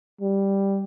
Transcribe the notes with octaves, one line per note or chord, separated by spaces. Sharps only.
G3